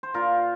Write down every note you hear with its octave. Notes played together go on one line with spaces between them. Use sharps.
C5
A#2 F4 A#4